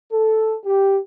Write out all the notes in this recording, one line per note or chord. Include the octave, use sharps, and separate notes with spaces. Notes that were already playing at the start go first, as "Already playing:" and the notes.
A4
G4